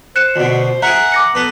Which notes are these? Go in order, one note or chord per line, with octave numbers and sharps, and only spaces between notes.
C5 F#6 C#7 E7
D2 B2
G#4 A#4 E5 F#5 A#5 C#7
D6 A#6 C#7
B3 A4 B4